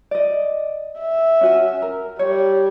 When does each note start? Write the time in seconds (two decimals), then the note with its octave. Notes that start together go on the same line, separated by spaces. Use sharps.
0.11 D5 D#5
0.99 E5
1.41 C#4 F#4 G#5
1.82 A#4
2.19 G3 C#5